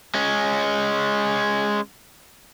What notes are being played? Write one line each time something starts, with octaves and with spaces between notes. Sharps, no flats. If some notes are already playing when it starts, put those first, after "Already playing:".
G#3 C#4